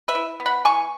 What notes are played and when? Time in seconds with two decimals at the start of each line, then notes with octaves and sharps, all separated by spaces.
0.08 B4 E5
0.15 E4
0.40 B3
0.46 F#5 B5
0.65 E3 G#5 C#6